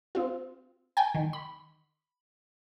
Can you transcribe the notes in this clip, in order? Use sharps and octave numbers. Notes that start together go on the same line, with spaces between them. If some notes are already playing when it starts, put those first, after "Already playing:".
C4 F4
G5 G#5
D#3
B5